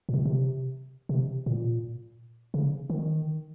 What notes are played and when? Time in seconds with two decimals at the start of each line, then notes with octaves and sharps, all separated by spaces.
0.09 A#2
0.14 C3
0.25 C3
1.09 C3
1.46 A#2
2.54 C#3
2.90 D#3